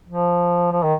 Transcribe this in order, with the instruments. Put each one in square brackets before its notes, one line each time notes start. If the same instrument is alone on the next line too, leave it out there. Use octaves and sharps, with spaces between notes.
[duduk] F3
F3
D#3